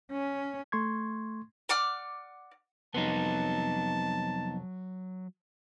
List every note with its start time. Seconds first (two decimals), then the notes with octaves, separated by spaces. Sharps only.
0.12 C#4
0.72 A3 C6 C#6 G#6
1.69 D5 F#5 D6 F6
2.94 C2 F2 F#3 B3 D#4 C5 A5